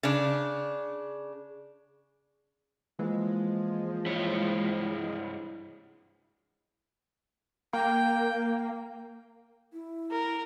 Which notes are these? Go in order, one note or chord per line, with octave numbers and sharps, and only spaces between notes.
C#3 D4
E3 F3 G#3 A#3
G2 E4 C#5
A#3 G5
E4
A#4